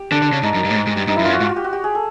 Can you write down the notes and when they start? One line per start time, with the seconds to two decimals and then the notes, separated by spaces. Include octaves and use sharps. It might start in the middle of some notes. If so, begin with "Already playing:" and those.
Already playing: G4
0.11 D3 D4
0.22 D3
0.33 C#3
0.43 G#2 D#4
0.54 F#2
0.64 G2
0.71 A2
0.76 G#2
0.87 G#2
0.97 G2
1.08 G2 D#4
1.16 F#2 E4
1.24 G2 F4
1.29 F#2
1.33 F#4
1.40 G#2 F4
1.49 F#4
1.56 G4
1.64 F#4
1.73 G4
1.84 G#4
1.95 A4